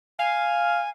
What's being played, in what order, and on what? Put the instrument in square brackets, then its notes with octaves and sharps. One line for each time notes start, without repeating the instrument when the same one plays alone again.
[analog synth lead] F5 [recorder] G#5